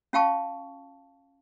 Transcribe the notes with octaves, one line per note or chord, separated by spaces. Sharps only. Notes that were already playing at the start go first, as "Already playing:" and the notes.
C#4 F4 F5 G5 A5 C#6